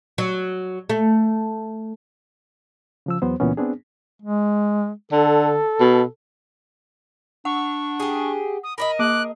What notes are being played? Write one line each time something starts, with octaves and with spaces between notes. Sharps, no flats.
F#3
A3
C#3 F3 E6
E2 F#3 B3 C5
C#2 A#2 E3 B3 C#4
B3 C4 D4 G#4
G#3
D3 A4
B2
D4 F#5 C#6
G4 G#4
D#6
A#4 D5 D#5 B5
A#3 D6 F#6